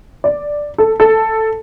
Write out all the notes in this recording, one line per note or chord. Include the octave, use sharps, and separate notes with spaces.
D5
A4
A4